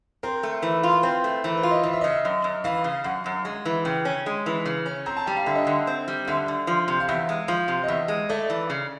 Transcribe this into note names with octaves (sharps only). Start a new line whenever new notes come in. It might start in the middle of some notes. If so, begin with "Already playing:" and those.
C4 A#4
A3
E3
F4
C4 B4
A3
E3 A#4
C5
F4
D#5
E3 F5
E5
C#3 D#5
E5
F#2
F#2
E3 F5
C#3
F#2 F#5
F#2
G#3
E3
C#3 G5
C#4
G#3
E3
C#3
C#4
C4 A#5
A5
G3 G5
F5
D3 E5
D#5
D3 E5
C4
G3
D3 E5
D3
F3
C3
F5
E2 E5
G#3
F3 F5
C3
D#5
E2 E5
G#3
A3 D5
E3
C#3